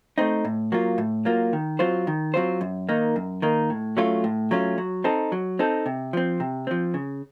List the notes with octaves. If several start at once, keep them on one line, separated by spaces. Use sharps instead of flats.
A3 C4 D#4
A2
F#3 A#3 F4
A2
F#3 A#3 F4
D#3
F#3 C4 F4 C5
D#3
F#3 C4 F4 C5
F#2
D#3 A#3 D#4
F#2
D#3 A#3 D#4
A2
F#3 A3 C#4 F4
A2
F#3 A3 C#4 F4
F#3
C4 D#4 A4
F#3
C4 D#4 A4
C3
F3 C4
C3
F3 C4
C#3